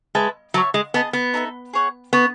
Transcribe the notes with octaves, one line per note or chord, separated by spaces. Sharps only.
G#3 B4 E5 A5
F#3 C#5 E5 A5
G#3
B3 G#4 D#5 A5 D#6
B3
D#4 A4 E5 A5
G#4 C#5 F#5
B3 B4 F#5 C#6